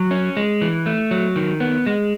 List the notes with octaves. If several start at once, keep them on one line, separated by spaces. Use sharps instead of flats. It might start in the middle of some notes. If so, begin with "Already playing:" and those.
Already playing: F#3
C#4
G#3
E3
A3
F#3
D#3
B3
G#3